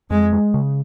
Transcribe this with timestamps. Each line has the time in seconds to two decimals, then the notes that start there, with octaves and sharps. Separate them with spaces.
0.10 F2 G#3
0.33 G#3
0.54 C#3